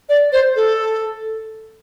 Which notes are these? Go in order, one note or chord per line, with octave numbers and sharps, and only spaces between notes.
D5
C5
A4